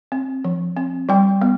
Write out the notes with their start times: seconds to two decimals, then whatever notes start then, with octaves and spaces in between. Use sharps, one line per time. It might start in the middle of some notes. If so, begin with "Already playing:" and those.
0.12 C4
0.44 F3
0.77 C4
1.09 G3 G5
1.42 B3